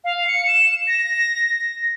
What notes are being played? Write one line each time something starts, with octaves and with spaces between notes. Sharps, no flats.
F5
C#7
E7
A#6